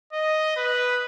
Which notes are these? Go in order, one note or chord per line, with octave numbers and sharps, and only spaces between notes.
D#5
B4